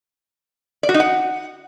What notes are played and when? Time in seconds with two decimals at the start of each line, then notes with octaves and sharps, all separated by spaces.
0.83 D5
0.89 F#4
0.94 D#4
1.00 F#5